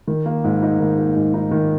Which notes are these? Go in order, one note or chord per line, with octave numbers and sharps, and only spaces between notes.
D#3
A#3
G#2
D#4
D#3
A#3
G#2
D#4
D#3